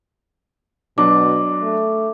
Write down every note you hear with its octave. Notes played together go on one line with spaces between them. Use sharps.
B2 F#3 D4 D6
A3